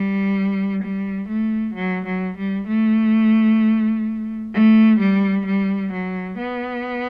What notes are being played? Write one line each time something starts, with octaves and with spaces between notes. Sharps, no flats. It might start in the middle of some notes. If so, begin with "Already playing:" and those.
Already playing: G3
G3
A3
F#3
F#3
G3
A3
A3
G3
G3
F#3
B3